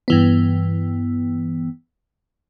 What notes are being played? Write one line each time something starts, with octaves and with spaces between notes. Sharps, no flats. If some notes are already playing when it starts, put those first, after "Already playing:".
G2 E3 B3